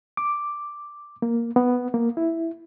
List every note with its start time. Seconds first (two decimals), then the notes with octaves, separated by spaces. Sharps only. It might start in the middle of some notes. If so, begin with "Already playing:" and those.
0.17 D6
1.22 A#3
1.56 B3
1.94 A#3
2.17 E4